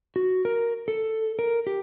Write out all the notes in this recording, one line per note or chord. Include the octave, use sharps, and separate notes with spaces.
F#4
A#4
A4
A#4
G4